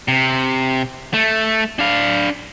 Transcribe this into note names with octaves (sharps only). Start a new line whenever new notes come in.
C3
A3
D4 F5